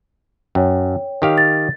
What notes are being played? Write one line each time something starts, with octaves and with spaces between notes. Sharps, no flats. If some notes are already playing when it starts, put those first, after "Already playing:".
F#2 C#5 G5
D#3 G4 F5
A6